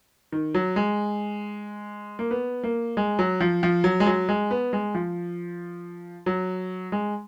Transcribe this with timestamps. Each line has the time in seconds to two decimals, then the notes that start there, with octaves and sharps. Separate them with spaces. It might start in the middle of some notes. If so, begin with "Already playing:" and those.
0.32 D#3
0.54 F#3
0.76 G#3
2.19 A#3
2.31 B3
2.63 A#3
2.97 G#3
3.19 F#3
3.41 F3
3.63 F3
3.84 F#3
4.00 G#3
4.06 F#3
4.29 G#3
4.51 B3
4.73 G#3
4.95 F3
6.26 F#3
6.92 G#3